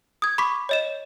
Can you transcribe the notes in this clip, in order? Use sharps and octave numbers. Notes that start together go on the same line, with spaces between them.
D#6 G#6
B5 C#6 D6 B6
C#5 D#5 E7